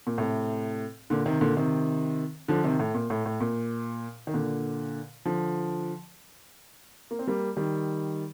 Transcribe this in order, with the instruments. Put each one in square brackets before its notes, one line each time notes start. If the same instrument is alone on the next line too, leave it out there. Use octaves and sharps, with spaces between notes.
[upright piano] A#2
A2 C3
A#2 D3
C3 D#3
A#2 D3
C3 D#3
D3 F3
C3 D#3
A2
A#2
A2
A2
A#2
D#3
A#2 D3
D3 F3
A#3
C4
G3 A#3
D#3 G3